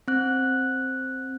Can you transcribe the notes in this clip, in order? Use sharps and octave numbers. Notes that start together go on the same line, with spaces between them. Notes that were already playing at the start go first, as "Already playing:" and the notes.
C4 F#6